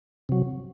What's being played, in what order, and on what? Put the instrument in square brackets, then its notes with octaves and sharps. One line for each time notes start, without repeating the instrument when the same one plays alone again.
[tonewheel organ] C3 F#3